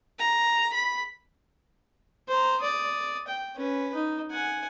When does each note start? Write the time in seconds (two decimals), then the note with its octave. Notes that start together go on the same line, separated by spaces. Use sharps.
0.19 A#5
0.74 B5
2.28 C5 A#5
2.61 D5 D#6
3.28 G5
3.56 C#4 B4
3.95 D#4
4.31 F#5 G#5